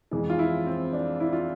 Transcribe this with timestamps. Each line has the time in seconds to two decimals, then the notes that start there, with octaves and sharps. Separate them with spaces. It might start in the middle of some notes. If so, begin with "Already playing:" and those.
0.11 F2 E3 G#3
0.30 F4
0.39 E4
0.67 C4
0.93 D4
1.20 E4
1.33 F4